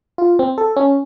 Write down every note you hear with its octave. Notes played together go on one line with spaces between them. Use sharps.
F4
C4
A4
C#4